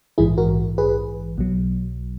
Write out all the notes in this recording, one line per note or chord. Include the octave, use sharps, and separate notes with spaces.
A#1 G#2 E3 E4 G#4
F#4 A#4
G#4 B4
B1 B2 F#3